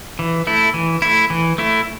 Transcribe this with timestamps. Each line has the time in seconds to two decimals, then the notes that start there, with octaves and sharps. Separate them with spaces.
0.19 E3
0.47 A3 E4
0.74 E3
1.02 A3 E4
1.30 E3
1.58 A3 E4